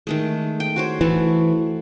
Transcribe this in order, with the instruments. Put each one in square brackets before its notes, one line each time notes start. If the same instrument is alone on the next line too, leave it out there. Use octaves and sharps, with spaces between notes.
[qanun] D#3 G#3 A3
G5
F#4 C5 C#5
[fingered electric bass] E3 [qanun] A3 F#4 A4